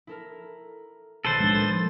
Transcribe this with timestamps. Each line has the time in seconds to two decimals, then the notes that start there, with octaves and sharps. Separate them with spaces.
0.07 E4 A4 A#4
1.25 B1 D#3 A4 B4 C5 A6
1.40 A2 F3 G#3 D4
1.57 A#3 B3 D#4